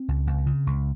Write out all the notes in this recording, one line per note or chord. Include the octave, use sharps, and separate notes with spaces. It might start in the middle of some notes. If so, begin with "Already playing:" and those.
Already playing: C4
C#2
C#2
C#3
C#2